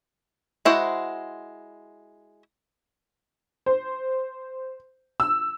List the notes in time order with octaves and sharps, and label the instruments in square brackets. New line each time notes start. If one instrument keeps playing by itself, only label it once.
[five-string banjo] G#3 E4 F#4 C5 F#5
[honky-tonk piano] C5
E6